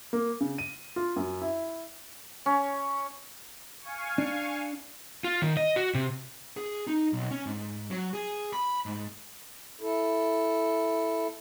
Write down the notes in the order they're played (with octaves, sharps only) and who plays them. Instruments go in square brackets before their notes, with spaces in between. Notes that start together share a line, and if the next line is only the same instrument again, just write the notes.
[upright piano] A#3
C#3
D#7
F4
F#2
E4
[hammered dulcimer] C#4
[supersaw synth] F5 G#5 C#6
[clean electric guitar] D4
[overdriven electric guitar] F4
D#3
D#5
F#4
C3
[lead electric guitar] G#4
D#4
B1
C#4
G#2
F#3
G#4
B5
G#2
[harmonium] E4 A4